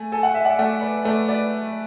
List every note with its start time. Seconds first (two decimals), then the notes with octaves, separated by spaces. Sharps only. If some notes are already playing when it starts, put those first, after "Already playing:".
Already playing: A3 G#5
0.12 A4 G#5
0.23 F#5
0.34 E5
0.45 D5 F#5
0.58 A3 D5 F#5
0.81 B4 D5
1.05 A3 B4 D5
1.28 B4 D5